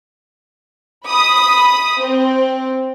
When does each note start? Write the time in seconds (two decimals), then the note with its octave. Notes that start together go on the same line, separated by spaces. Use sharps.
1.06 B5 D#6
1.99 C4